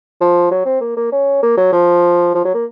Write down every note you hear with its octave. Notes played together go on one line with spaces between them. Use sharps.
F3
F#3
C4
A#3
A#3
C#4
A#3
F#3
F3
F3
F#3
A#3